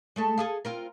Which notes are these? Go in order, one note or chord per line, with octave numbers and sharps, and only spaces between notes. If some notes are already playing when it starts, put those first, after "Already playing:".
G#3 A3 A4
G#4 A4 F5
C4 F4 A#4